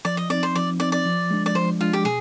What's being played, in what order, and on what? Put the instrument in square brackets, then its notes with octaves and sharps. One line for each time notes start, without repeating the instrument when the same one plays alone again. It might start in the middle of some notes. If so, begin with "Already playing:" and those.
[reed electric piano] F3 [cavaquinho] D5
[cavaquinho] D#5
[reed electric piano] C4 D#4 [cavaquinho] D5
[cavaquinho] C5
[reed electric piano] F3 [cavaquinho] D5
[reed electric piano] C4 D#4 [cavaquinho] D5
[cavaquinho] D5
[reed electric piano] F3
G#3 D4
[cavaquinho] D5
[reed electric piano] F3 [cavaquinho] C5
[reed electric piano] G#3 D4 [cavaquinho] F4
[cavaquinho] G4
[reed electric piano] B2 [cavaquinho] G#4